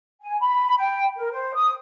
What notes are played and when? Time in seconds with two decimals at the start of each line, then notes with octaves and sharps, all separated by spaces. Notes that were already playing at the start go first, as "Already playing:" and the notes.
0.21 G#5
0.40 B5
0.77 G5
1.16 A#4
1.32 C5
1.55 D#6